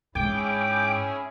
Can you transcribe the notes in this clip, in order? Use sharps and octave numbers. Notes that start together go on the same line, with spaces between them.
G#2 C#4 E4 G#4 G5 D6